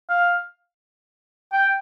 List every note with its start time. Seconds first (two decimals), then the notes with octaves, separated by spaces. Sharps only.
0.10 F5
1.53 G5